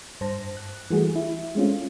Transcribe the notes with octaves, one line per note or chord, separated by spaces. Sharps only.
G2 C5 A5 A#6
F#6
E3 G3 A3 F#4 G#4
E4
G#3 A3 C4 C#4 F4